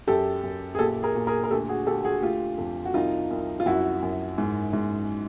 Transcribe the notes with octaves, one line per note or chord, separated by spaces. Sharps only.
F#2 G4 A4
F#2
G#4
A#2 G4 A4
G#4 A#4
A#2
G#4 A#4
A#4
D2 G4 A4
F#4 G#4
D2 G4 A4
F#4 G#4
A3 F4 G4
F2
F#4
C2 D#4 F4
C2
F4
F#2 E4 F#4
F#2
G#2
G#2